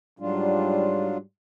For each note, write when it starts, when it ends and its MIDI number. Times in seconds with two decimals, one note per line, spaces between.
0.20 1.21 44
0.20 1.17 54
0.20 1.21 55
0.20 1.17 62
0.20 1.17 65